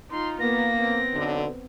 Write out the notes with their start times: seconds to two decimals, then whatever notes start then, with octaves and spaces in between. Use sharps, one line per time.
0.11 D#4 F4 C6
0.40 A#3 B3 A#6
0.76 B3 C4
1.13 B1 D3